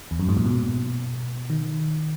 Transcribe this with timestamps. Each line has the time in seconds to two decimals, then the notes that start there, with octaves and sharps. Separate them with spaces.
0.11 E2
0.20 F#2
0.29 G#2
0.37 A#2
0.46 B2
1.50 D#3